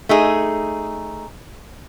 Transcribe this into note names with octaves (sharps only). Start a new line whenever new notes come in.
A3 D#4 G#4